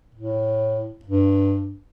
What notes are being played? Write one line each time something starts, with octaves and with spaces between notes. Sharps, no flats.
A2
G2